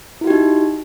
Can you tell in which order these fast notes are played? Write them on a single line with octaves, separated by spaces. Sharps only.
E4 F#4 G4 D#4